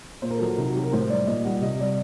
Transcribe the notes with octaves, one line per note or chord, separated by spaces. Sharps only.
A#2 C5
A#4
F#3 A4
A#4
C3 D#4
F#4
F#3 G4
A#4
A2 C5
G3 D5
A#2 D#5
G3 F#5
C3 D#5
G3 D5